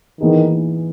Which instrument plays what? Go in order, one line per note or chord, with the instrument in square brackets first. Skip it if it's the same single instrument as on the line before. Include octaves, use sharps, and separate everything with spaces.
[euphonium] D#3 [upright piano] E3 B3 D#4 G#4